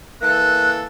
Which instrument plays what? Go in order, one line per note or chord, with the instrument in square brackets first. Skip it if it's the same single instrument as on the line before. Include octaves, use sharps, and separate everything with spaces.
[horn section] E3 A#3 A4 [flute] F#6